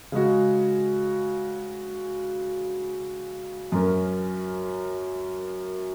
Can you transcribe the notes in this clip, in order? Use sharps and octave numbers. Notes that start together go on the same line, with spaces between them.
C#3 G#3 F#4
F#2 F#3 C#4 A#4